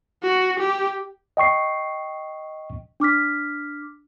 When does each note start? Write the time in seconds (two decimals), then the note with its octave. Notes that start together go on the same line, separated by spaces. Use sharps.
0.23 F#4
0.59 G4
1.37 D#5 G5 C#6 C7
3.00 D4 D6 F6 B6